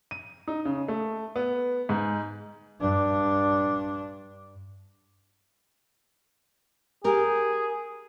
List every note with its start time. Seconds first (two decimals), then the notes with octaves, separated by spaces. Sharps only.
0.11 D#7
0.48 D#4
0.65 C#3
0.88 A3
1.36 B3
1.89 G#2
2.79 G2 D4
7.04 G4 G#4 A#4